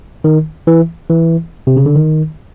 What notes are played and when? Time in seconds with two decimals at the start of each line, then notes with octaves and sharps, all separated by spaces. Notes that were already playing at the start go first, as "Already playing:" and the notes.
0.24 D#3
0.67 E3
1.10 E3
1.67 C3
1.77 C#3
1.86 D3
1.96 D#3